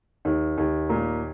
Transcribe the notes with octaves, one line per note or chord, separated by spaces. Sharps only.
D#2
D#2
A#2